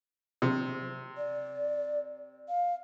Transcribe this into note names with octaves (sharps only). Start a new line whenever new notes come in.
C3
D5
F5